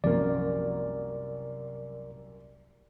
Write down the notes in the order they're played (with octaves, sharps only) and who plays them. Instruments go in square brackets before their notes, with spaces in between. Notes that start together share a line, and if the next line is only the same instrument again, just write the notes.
[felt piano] C2 F#2 A#3 [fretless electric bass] F3 [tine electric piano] A#4 D5